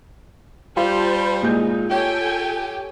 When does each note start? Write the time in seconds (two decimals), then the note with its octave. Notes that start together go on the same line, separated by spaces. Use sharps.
0.77 G3 F4 C5 A5
1.43 A#2 G#3 D#4 G6
1.91 G4 A4 C#5 G5 G#5